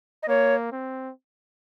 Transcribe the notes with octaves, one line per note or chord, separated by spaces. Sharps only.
D#5
A#3 C#5
C4